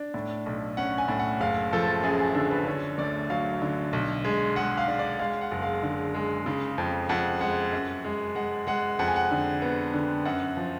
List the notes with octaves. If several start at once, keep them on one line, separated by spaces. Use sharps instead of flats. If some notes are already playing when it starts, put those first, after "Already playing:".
Already playing: D4
A2
B1
C#4 F#5
G#5
A2
F#5
F#1 F5
F3 A4
F#2 G#4
G#4
D3 A4
B4
D3 C#5
D2 D5
F#3 F5
D3
B1
G#3
G#3 F#5
F5
D4
D5
G#3 F5
F#5
F#1
F5
D3
G#3
C#3
F2
F2 F#5
G#3 F#5
F#2
G#3
G#3 F#5
G#3 F#5
F2 F#5
G#5
F#5
D3
B3
D3
F#2 F#5
F3